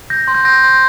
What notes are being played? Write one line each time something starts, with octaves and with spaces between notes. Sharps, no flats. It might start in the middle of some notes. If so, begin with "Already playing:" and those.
G6 A#6
C6
G6
G6 A#6
C6
A#6